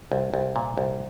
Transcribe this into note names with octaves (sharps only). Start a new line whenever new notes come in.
C2
C2
A#2
C2